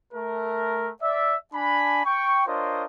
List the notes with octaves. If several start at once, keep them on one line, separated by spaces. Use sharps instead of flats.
A3 A#4
D5 E5
D4 G#5 B5
G5 C#6
D4 F4 A#4 C5 C#5 D#5